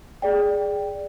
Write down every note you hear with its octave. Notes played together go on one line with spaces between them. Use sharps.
G#4 D5 G5